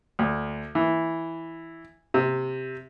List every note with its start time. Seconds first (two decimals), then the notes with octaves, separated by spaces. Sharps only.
0.19 D2
0.75 E3
2.14 C3